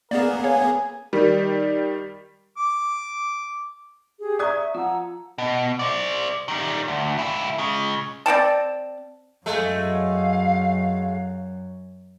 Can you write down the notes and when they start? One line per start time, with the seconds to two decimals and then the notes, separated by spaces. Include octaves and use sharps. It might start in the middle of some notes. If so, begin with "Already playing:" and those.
0.11 A#3 B3 G#4 A#4 D5 E7
0.44 C#5 F5 G#5
1.13 D#3 G3
2.58 D6
4.20 G4 G#4
4.39 D5 E5 A#5 C#6 D#6 G#6
4.75 F3 F4 F#5 A#5 E6
5.38 B2
5.79 C5 D5
6.48 D#3 G3
6.88 D2
7.18 C#2 E4
7.58 C#3 G#3
8.26 C4 D5 G5 A5
9.46 F#2 F#3 G#3 A3 F5